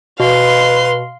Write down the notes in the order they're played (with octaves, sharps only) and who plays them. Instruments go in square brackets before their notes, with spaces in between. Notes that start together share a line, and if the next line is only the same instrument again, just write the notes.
[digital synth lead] B2 [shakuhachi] B4 [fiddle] F5 C6